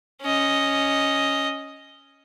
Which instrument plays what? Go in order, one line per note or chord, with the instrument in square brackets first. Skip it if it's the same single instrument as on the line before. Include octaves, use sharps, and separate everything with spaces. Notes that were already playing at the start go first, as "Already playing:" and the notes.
[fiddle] C#4 D#5